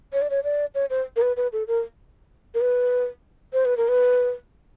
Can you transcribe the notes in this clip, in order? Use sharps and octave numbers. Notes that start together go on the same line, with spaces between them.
C#5
D5
C#5
D5
C#5
C5
A#4
B4
B4
A4
A#4
A#4
B4
C5
B4
A#4
B4